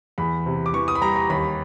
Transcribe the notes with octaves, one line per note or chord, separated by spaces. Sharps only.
E2 B5
C3
D6
E3 C#6
D#6
B5
G3 A#5
A#5
D#2 B5